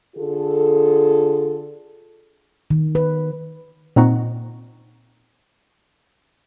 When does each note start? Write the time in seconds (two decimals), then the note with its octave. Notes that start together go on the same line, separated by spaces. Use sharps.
0.17 D3 F4 G#4 A4
2.71 D#3
2.95 B4
3.96 A#2 C4 D#4 F#5 A#5 C#6